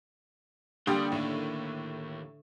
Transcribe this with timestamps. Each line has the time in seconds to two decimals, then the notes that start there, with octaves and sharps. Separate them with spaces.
0.87 D3 G3 A#3 D4 G4 G5 C6 D#6
1.12 D#2 A2 D#3